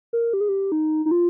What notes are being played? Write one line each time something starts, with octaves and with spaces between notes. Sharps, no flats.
A#4
G4
G#4
G4
D#4
D#4
F4